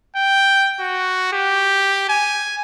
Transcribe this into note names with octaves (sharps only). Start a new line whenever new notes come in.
G5
F#4
G4
G#5